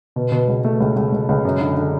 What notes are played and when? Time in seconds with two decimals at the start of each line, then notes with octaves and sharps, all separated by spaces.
0.16 B2
0.32 B2
0.48 C#2
0.65 A3
0.80 C#2
0.97 C#2
1.13 C#2
1.29 C#2
1.45 F#2
1.61 D3
1.77 D3